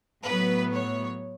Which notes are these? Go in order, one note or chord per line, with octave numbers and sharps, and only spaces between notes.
A2 F#3 B3 B4
C#5